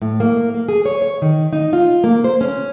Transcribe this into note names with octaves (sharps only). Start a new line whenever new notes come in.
A2
A#3
A#3
G#4
C#5
C#5
D#3
D#4
F4
A#3
C5
C#4